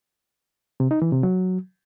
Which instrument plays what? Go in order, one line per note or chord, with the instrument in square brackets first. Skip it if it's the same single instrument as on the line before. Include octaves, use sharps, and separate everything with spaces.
[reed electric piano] C3
D#4
E3
C3
F#3